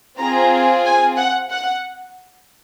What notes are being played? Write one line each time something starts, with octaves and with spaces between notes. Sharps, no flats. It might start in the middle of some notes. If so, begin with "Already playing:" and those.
C4 F4 G#4 A#5
G#5
F#5
F#5